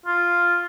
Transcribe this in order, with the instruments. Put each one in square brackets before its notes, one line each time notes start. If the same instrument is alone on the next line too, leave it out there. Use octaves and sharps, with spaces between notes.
[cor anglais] F4